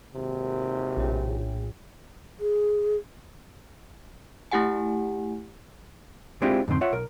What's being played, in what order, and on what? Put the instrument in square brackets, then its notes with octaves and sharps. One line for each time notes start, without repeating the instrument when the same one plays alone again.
[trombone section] G#1 D#2 C3
[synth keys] A#1 A2
[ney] G#4
[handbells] A3 E4 G4 F#5 G#5
[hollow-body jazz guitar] G#3 C4 D4 E4 F4 G4
F2 G#2 D3 C4 C6
F4 C#5 E5 F#5
B1 A#4